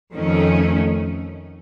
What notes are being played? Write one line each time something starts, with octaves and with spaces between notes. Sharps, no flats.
F2 D#3 A3 C#4